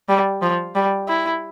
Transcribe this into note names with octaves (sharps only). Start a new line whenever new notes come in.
G3
F3
G3
E4